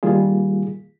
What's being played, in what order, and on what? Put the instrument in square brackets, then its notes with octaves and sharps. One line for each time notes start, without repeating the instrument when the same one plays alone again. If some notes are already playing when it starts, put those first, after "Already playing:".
[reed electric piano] D#3 G3 A#3 F4 G#4